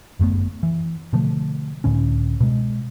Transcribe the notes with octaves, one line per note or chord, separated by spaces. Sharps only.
G1 F#2 A3 B3
E3
B2 D3 F3 A3
C#2 A2 D3 C#4
B2 G#3